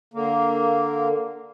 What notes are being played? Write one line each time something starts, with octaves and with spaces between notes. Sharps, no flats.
D3 A#3